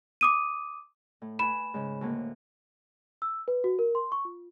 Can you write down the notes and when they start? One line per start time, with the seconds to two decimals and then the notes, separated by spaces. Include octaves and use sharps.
0.21 D6 D#6 D#7
1.22 A2
1.39 B4 G#5 B5 E7
1.74 G#2 C#3
2.01 D2 A2 A#3
3.22 E6
3.48 B4
3.64 F#4
3.79 A#4
3.95 C6
4.12 C#6
4.25 F4